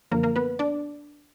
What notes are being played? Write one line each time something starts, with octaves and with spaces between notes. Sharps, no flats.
F#2 D3 F3 A#3 A#4
A#3 A#4
B3 B4
D4 D5